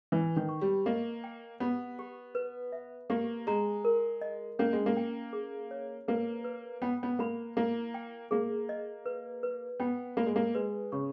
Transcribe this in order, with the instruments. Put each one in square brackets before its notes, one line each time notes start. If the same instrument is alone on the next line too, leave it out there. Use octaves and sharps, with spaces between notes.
[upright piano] E3 [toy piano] B4
[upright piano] D#3
[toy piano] C#6
[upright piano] G3
[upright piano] A#3 [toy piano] D#5
[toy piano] G5
[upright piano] B3 [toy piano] G4
[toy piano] G4
B4
E5
[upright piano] A#3 [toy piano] G4
[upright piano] G#3 [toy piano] A#5
[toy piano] A#4
D#5
[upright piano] A#3 [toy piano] C#4
[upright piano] G#3
A#3
[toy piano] G5
G#4
C#5
[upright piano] A#3 [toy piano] B4
[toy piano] B4
[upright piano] B3 [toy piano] G5
[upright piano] B3
[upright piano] A#3 [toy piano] B5
[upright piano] A#3 [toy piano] E4
[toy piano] G5
[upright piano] A#3 [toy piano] G#4
[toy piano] D#5
B4
B4
[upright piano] B3 [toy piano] G5
[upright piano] A#3 [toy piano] B5
[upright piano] G#3
A#3
[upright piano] G#3 [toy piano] B4
[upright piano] C#3 [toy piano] C#6